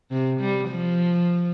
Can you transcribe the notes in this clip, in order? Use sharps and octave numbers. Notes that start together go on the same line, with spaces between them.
C3
G3
F3